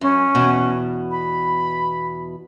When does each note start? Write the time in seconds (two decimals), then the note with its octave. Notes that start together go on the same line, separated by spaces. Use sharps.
0.01 F#2 C#4
0.35 E2 B2
1.11 B5